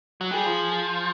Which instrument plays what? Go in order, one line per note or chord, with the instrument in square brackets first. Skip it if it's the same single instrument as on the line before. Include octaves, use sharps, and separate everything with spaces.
[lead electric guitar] F#3
[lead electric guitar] G3 [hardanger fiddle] G#4
[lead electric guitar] F3